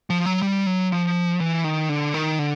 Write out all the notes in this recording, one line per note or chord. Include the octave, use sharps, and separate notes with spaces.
F3
F#3
G3
F#3
F3
E3
D#3
D3
D#3
D3